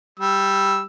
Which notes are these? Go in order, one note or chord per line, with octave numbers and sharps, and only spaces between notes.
G3 E6